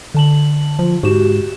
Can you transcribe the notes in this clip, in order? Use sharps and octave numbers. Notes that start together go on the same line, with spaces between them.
D3 A5 F#7
F3
G#2 F#4 G4 E7